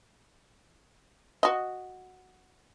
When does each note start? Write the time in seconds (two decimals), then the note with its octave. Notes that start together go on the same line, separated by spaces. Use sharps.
1.43 F#4 D#5